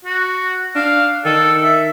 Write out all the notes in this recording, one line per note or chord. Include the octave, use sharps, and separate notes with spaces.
F#4
D4 F5
D#3 A4
E5